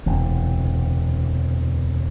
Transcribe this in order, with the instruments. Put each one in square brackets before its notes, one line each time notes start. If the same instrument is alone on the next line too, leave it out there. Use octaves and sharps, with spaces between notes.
[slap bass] E1 D2 C3 E3